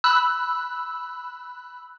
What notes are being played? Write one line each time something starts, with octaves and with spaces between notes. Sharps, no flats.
B5 E6 F#6